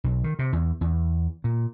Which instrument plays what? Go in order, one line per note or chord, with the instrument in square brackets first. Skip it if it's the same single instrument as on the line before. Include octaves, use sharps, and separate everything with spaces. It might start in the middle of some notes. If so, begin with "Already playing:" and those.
[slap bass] B1
D#3
C3
E2
E2
A#2